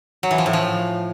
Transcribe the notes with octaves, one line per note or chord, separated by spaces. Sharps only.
F#3
E3
F3
A2
F3